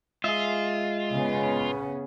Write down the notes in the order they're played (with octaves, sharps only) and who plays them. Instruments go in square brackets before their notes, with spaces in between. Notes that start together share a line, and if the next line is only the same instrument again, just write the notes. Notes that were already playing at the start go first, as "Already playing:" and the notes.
[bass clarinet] G#3 [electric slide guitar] F4 [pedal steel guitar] G#4 E5
[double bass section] C#3 B3 C#4